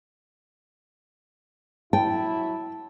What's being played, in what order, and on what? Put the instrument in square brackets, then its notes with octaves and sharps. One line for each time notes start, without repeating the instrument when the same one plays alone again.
[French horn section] F#3 E4 [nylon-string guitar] G5 [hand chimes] A5